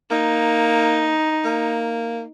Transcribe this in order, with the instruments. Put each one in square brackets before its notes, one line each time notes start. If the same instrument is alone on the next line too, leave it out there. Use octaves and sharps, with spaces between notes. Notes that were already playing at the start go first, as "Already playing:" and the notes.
[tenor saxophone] A#3 [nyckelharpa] D#4
[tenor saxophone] A#3